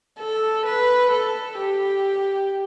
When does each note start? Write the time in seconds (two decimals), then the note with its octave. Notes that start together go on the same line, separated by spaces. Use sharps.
0.19 A4
0.66 B4
1.12 A4
1.58 G4